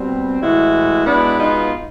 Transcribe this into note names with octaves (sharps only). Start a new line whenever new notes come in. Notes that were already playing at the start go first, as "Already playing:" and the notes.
Already playing: B2 G3 C4
A2 E3 G#3 E4 F#4
B2 G#3 B3 D4 E4
D#4 F4